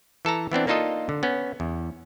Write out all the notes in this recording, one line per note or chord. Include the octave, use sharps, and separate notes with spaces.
E3 A4 A5 A#5
E3 B3 C4 D4
A#3 D4 D#4 F4 A4 D#5
D3
B3 C#4
E2